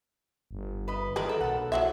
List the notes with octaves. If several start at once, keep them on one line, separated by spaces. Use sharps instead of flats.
G1
B4 D#5
E2 D#3 G#3 A#4 B4 D5
A4
B1 A4 F#5
E3 F#3 E5